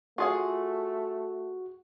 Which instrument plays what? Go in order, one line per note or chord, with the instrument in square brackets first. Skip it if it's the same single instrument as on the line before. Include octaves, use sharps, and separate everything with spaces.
[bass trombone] A3 [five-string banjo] F4 G#4 F#5 [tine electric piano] F#4